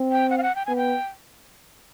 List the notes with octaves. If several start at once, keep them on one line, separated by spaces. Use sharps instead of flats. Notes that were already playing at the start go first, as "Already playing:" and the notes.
Already playing: C4
G5
F#5
F5
F#5
G5
B3 G#5
G5